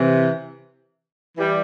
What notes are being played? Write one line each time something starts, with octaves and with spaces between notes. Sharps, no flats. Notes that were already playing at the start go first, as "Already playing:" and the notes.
Already playing: C3 E3
E3 G3